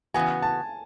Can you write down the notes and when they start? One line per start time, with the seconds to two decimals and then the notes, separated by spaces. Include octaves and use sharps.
0.14 C#3 E3 B3 F#4 G#5
0.42 A5